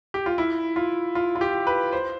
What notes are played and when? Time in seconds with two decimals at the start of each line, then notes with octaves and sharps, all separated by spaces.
0.14 G4
0.26 F4
0.38 E4
0.76 F4
1.15 F4
1.36 F4
1.41 G4
1.67 B4
1.93 C5